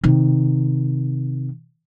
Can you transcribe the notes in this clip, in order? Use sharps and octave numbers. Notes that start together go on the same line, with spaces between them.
C3 D#3